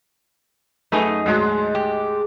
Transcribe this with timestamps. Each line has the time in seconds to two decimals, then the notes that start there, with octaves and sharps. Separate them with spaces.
0.92 F#2 A3 D#4 G#4 B4
1.26 D2 G#2 F#3 G#3
1.75 G4